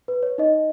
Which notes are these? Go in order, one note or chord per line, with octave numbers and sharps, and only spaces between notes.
B4
C#5
D#4 D#5